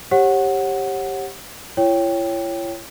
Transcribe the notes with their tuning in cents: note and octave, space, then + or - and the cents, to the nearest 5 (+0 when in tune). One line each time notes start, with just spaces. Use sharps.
G4 +0 C#5 -35 F#5 +0
E4 +45 C#5 +0 G5 +0